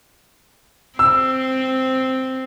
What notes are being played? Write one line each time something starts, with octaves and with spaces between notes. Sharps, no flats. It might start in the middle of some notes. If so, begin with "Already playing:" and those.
C4 E6